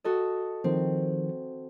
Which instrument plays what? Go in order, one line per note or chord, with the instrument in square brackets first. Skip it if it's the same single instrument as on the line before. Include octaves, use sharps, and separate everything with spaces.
[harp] F#4 A4 D#5
[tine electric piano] D#3 F3 [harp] C4